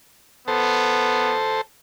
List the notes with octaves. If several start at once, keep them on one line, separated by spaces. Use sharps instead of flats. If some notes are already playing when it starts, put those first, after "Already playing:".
B3 A4 C5